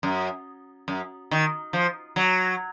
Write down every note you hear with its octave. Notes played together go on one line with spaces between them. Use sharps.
F#2
F#2
D#3
F3
F#3